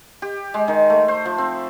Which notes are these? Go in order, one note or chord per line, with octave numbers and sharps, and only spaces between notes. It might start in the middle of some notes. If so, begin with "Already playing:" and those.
G4
G#3
D#3
A3
C5
F3
C4